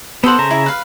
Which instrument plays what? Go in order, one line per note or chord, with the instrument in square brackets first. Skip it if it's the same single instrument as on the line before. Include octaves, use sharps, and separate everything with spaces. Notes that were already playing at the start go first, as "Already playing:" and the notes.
[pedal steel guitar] B3 F#5 [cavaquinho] A4 C5
[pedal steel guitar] C#3 E5 A#5
[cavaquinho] E4
B4 F5